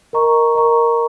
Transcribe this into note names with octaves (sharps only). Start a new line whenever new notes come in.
A#4 D#5 A#5 C#6
A#4 D#5 A#5 C#6